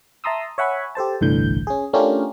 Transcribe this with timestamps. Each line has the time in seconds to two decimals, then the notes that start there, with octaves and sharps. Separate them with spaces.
0.24 E5 A5 A#5 C6 D#6 E6
0.58 C#5 E5 F#5 G#5 B5 C#6
0.95 G4 A4 C5 A5
1.21 G1 C2 A2 D3 E3 G6
1.67 C#4 G#4
1.93 A3 C#4 D4 F4 G4 A#4